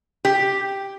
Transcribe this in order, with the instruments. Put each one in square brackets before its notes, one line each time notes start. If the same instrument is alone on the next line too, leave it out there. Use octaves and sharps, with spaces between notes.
[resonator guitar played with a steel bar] G4